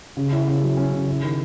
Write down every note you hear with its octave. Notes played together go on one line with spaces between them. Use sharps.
C#3
E4
C#3
F#3
C#4
C#3
E4
D#3